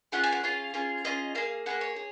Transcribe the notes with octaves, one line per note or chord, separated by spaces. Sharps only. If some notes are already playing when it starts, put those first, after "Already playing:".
C#4 F4 G#4 F#5
G#5
F#5
C#4 F4 G#4 F5
C#4 F4 G#4
C#4 F4 G#4 D#5
A#3 F4 G#4 F5
A#3 F4 G#4 F#5
C#5
G#4